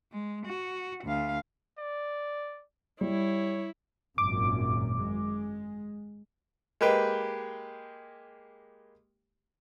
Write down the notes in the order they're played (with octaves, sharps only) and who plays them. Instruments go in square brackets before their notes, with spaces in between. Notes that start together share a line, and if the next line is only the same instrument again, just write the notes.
[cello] G#3
F#4
D2 F5
[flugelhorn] D5
[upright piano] G3 [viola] E4 [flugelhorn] C#5
[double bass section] G#1 F#2 A#2 [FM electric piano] D6
[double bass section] G#3
[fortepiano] G#3 A#3 G4 B4 G5